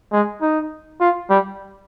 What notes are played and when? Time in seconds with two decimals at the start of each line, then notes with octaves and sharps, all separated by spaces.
0.12 G#3
0.42 D#4
1.01 F4
1.30 G3